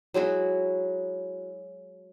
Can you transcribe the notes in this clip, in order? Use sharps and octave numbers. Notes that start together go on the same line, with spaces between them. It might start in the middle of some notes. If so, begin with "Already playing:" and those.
F#3 G#3 E4 F#4